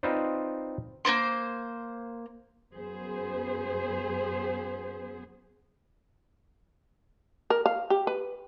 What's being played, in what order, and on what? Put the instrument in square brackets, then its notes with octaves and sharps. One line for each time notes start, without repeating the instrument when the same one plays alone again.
[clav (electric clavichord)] C4 D#4 F4 B4 C5 D5
[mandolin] A#3 C4 C5 C6
[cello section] F#2 B3 G#4 C5
[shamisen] A#4
F5
G4
B4